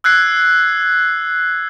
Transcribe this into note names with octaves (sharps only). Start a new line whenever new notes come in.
E6 F#6 G#6 C7